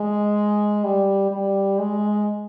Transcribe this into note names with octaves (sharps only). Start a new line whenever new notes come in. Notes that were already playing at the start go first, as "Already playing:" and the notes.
Already playing: G#3
G3
G3
G#3